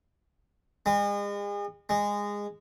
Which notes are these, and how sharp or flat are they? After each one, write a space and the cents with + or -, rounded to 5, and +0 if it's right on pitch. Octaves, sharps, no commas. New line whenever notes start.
G#3 -40
G#3 -20